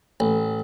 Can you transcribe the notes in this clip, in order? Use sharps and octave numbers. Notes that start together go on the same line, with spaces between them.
A1